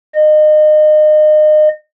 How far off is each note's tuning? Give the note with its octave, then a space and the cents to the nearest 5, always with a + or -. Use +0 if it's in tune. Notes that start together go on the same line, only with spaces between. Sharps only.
D#5 -30